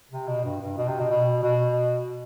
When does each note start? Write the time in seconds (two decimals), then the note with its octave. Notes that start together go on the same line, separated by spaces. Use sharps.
0.11 C3
0.28 B2
0.44 G2
0.61 G2
0.77 B2
0.88 C3
0.99 B2
1.11 B2
1.43 B2